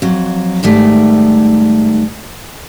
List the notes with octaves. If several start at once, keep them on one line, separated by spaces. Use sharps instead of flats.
F2 F#3
G#2 D#3 G3 A3